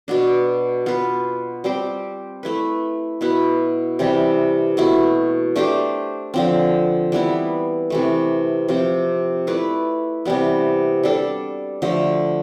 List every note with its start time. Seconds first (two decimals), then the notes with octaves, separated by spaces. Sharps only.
0.08 B2 B3 D4
0.86 B3 F4 B4
1.64 G3 C4 G4 C5
2.43 A3 E4 B4
3.21 B2 B3 E4 B4
3.99 C3 E3 G3
4.77 B2 A3 E4
5.56 A3 D4 G4 C5
6.34 D3 F3 C4
7.12 E3 G3 B3 E4
7.90 C3 E3 A3
8.68 C3 F3 C4
9.47 A3 E4 B4 D5
10.25 C3 E3 G3 B3
11.03 G3 D4 A4
11.82 D3 F3 A3